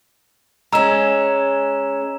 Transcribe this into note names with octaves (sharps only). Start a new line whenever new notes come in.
G#3 C#4 A#5 E6 E7